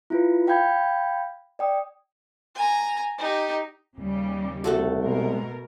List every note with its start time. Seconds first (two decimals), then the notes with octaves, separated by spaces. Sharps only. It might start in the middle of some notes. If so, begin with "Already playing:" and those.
0.10 E4 F4 B4
0.47 F5 G5 B5 G6 G#6
1.59 D5 G5 D#6
2.55 G#5 A#5
3.18 D#4 G4
3.98 D#2 C#3 G3
4.64 C2 A3 F#4 A4
5.04 B2 G#3 A#4